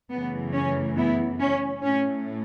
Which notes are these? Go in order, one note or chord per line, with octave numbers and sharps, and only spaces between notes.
F#2 C#3 E3 A3 B3
C#4
B3 E4
C#4
A2 A3 C#4